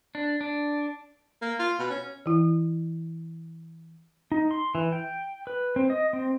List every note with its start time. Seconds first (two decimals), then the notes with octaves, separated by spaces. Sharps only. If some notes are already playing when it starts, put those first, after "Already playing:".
0.15 D4
0.41 D4
1.42 A#3
1.59 F4
1.79 B2
1.90 C#4
2.26 E3 E4
4.32 D#4
4.51 C6
4.75 E3
4.92 G5
5.47 B4
5.76 C4
5.90 D#5
6.13 C4